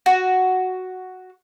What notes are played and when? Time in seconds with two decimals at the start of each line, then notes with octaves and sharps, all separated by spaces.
0.06 F#4